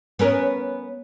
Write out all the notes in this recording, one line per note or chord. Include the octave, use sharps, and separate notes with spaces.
B3 C#4 A#4